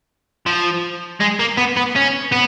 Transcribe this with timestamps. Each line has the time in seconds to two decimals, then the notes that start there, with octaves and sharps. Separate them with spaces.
0.46 F3
1.20 G#3
1.39 A#3
1.57 B3
1.77 B3
1.96 C#4
2.32 B3